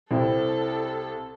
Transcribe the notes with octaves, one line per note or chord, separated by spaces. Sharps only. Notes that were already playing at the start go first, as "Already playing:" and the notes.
C2 C4 E4 A4